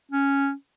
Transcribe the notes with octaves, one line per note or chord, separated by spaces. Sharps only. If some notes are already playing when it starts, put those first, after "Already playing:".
C#4